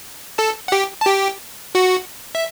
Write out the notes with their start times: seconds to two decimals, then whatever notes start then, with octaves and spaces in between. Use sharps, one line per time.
0.38 A4 A5
0.68 F#5
0.72 G4 G5
1.01 A5
1.07 G4 G5
1.75 F#4 F#5
2.35 E5